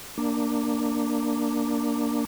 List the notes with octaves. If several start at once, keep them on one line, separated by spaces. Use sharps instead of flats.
A#3 D4